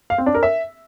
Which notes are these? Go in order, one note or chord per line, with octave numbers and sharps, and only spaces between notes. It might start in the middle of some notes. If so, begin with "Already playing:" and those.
F5
C4
D4
A#4
E5